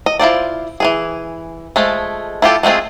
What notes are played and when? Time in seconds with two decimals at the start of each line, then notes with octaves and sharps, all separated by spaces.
0.06 D#5
0.19 E4 F4 C5 D5
0.80 E3 G#3 G#4
1.76 F3 G#3 A3
2.42 E4 F4 G4 A4
2.63 G#3 A3 C4 F4 G#4